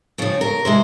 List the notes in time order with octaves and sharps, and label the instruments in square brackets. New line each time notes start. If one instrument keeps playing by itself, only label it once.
[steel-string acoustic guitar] C#3 F3 C4 C#5
A#4
C3 E3 G#3 C5